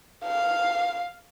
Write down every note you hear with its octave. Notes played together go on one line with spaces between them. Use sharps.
F5